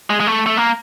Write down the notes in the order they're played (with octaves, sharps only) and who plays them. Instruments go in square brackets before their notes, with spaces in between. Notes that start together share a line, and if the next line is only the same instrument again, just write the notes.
[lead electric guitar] G#3
G#3
A3
A3
A#3